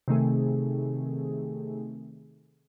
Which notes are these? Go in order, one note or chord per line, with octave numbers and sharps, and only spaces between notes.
C3 D#3 A3 G#4